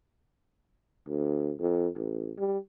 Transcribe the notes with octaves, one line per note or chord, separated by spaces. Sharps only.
D2
F2
A1
G3